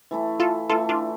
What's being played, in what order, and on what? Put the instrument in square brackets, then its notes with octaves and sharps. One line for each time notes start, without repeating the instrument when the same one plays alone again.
[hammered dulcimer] E3 A3 E4
[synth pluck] F4 A4
[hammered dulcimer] E3 A3 E4 [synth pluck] F4 A4
[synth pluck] D4 F4